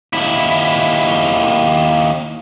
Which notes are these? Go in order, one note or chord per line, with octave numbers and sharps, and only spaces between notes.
D#2 E4